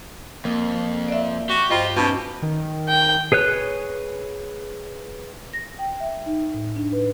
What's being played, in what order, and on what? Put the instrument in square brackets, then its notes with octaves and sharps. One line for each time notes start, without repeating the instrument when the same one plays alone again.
[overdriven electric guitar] F2 [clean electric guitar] A#3
[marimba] D5 E5
[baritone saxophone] F#4 [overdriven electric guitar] G4
[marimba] G2 C5 G5 [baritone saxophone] F4 [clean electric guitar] D#5
[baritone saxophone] B2 [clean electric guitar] C#4 D#4 F4 [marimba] A5 C#6 G6
[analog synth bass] D#3
[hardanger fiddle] G5
[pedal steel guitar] G#4 B4 C#5 F#6
[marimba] A#6
G5
E5
D#4
A2
D4
B4